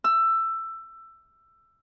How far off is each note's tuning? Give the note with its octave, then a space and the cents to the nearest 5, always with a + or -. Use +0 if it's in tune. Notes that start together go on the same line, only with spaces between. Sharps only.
E6 +15